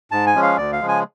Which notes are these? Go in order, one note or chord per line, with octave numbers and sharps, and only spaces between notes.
G#2 A5
G#5
F3 G#3 C#4
F5
D2 D5
F5
C#3 F3 G#3
G#5